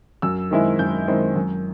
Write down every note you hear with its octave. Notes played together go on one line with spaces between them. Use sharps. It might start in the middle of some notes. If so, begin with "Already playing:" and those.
F#2 E6
D#3 G#3 C4 E4
F#2 G6
D#3 G#3 C4 E4
F#2